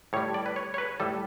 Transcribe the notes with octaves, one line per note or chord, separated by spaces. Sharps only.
A2 G3 C#5
D5
B4
C#5
C#5
B4
A2 G3 A4